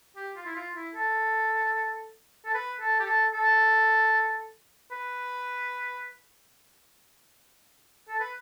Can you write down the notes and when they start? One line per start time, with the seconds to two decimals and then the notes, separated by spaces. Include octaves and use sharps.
0.16 G4
0.36 F4
0.46 E4
0.55 F4
0.76 E4
0.95 A4
2.45 A4
2.54 B4
2.80 A4
3.00 G4
3.06 A4
3.34 A4
4.92 B4
8.09 A4
8.20 B4